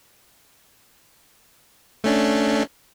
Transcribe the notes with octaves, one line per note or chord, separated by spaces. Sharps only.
A3 C#4 D4